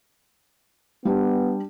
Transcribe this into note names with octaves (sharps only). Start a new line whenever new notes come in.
G3 B3 D4